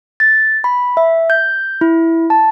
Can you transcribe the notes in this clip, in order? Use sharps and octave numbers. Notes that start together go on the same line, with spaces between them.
A6
B5
E5
G6
E4
A5